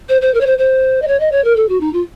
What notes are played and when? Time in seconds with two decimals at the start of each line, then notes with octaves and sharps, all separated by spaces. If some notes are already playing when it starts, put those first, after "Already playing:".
0.09 C5
0.22 C5
0.34 A#4
0.41 C#5
0.46 C5
0.58 C5
1.02 D#5
1.08 C#5
1.20 D#5
1.32 C#5
1.45 A#4
1.56 A4
1.69 F#4
1.81 D#4
1.93 F4